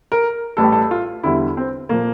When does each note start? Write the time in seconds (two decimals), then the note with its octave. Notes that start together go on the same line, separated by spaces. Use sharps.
0.12 A#4
0.57 A1 A2 G3 A4
0.64 G4
0.72 A4
0.91 F4
1.23 E2 D3 G3 E4
1.57 C4
1.89 A#2 F3 A#3